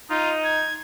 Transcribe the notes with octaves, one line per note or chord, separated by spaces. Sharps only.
D#4 F4
G#6